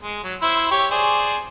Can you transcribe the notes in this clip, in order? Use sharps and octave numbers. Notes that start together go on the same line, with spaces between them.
G#3
F#3
E4 C5 E5
G4 C#5 C#6
G#4 C5 D5